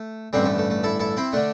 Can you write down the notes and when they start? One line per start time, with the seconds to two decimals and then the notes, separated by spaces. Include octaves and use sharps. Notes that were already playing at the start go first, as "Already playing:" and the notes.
Already playing: A3
0.33 A1 G2 D3 G3 C4
0.46 A3
0.58 A3
0.70 A3
0.84 E4 A4
0.99 E4 A4
1.17 C4 E4
1.33 D3 A3 D4